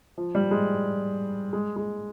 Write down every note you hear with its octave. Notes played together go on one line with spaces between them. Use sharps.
F3
G3
G#3
G#3
G#3